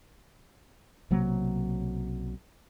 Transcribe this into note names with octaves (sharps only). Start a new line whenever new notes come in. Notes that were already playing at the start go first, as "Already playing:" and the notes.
B1 C3 F#3 A#3